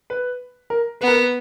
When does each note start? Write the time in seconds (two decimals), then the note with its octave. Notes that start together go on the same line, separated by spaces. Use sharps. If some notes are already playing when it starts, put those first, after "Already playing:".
0.10 B4
0.70 A#4
1.01 B3 B4
1.08 A#4
1.16 B4